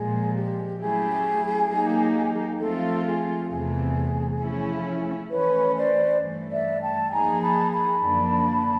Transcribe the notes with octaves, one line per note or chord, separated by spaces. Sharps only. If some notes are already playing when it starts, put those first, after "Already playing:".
Already playing: A#2 F3 G#3 G#4
G4
F#3 A3 C#4 E4 G4 G#4
F#3 A#3 D#4 G4
F3 A3 C4 F4 A4
G#4
E2 C3 E3 A3 G#4
F3 A3 C#4 E4
E3 A3 C#4 B4 C#5
C5 D5
G2 E3 A3
D5 E5
G5 A5
F3 A#3 D#4 G#4 G#5 A#5
A5 B5
A5 B5
F#2 D3 F3 A#3 D4